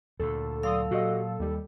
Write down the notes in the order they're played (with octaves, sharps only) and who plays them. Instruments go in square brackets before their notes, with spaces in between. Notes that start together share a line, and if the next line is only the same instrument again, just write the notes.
[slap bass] D2 A#2 [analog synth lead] A4
[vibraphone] F#3 F5 E6 [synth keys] D5 C6 D#6
[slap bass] A#2 [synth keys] F#4 G4 D#5
[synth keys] D#2 G3